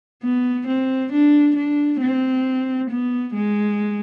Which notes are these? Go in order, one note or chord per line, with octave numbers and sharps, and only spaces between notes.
B3
C4
D4
D4
C4
B3
G#3